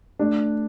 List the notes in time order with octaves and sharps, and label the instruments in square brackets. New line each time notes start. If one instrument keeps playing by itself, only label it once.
[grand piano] A3 [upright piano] D4